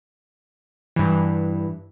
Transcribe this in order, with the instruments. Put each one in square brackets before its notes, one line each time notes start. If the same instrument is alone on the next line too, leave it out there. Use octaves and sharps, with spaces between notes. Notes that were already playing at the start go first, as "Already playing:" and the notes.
[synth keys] G2 E3